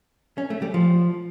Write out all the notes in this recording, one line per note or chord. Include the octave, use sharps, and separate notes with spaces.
C#4
A3
G3
F3